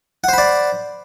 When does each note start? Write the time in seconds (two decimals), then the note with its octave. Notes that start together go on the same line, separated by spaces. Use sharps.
0.24 F#5
0.29 C5
0.33 B5
0.38 D5